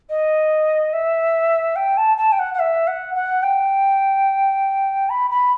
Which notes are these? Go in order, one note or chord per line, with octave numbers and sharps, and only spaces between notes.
D#5
E5
G5
A5
A5
G5
F#5
F#5
E5
F#5
F#5
G5
B5
B5